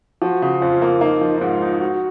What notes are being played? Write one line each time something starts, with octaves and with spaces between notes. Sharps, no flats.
F3 F#4
C#3
F2 F4
A#3
A#3 D#4
F3
G#2 F4
D#4
D#4 F#4